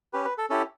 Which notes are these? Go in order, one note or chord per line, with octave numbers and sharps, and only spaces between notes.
C#4 G4 B4
B4
A4
C#4 E4 G4 A4